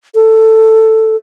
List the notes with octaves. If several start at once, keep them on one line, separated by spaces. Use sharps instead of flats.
A4